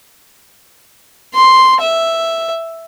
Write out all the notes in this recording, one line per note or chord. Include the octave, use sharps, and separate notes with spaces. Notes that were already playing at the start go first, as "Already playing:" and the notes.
C6
E5